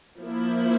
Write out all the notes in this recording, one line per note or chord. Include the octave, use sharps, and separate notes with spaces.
F3 A#3 E4